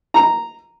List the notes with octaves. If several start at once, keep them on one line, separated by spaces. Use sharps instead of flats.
A#5